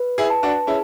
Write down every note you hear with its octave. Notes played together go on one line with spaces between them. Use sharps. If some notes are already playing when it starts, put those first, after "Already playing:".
Already playing: B4
E4 G#4
A5
D4 F#4
C#4 E4 G#4